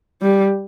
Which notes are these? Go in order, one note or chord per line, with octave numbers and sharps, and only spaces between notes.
G3